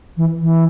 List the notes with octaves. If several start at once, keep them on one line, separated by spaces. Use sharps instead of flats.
E3
E3